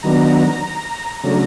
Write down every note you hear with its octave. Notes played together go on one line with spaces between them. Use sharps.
D#3 F#3 B3 D4 A#5
C#3 F#3 A3 D4 A#5